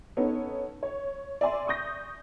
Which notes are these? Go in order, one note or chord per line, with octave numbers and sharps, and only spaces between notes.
B3 C#4 D#4 A4
C#5
D5 E5 G#5 C6
C#6 D#6 G6 A#6